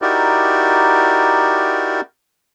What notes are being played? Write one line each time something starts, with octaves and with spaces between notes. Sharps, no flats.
D#4 E4 F#4 G4 A#4 D5